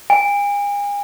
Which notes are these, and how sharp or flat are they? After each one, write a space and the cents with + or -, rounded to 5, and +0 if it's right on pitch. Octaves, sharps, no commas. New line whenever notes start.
G#5 -40